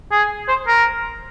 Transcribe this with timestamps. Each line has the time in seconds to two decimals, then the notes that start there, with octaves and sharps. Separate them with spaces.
0.11 G#4
0.48 C5
0.67 A#4